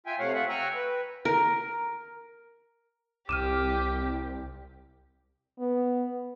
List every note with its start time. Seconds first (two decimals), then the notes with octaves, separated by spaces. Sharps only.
0.06 F4 E5 G5 G#5
0.19 C3 A3 C#5 F5 F#5
0.34 F4 E5 F#5 F#6
0.49 G5 G#5 A#5 C#6 E6 F#6
0.75 B4
1.25 A#4
3.29 C2 G4 D6 F6 D#7 E7
5.59 B3